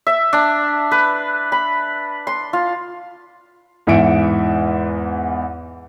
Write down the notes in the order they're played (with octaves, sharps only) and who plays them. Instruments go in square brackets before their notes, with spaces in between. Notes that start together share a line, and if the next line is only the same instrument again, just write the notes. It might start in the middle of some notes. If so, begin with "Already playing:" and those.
[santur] E5
D4
B4
B5
C6
F4
[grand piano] E2 G#2 E3 E5 C#7 D7